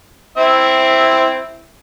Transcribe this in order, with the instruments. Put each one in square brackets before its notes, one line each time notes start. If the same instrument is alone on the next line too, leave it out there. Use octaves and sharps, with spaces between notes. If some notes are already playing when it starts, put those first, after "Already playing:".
[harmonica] C4 E4 E5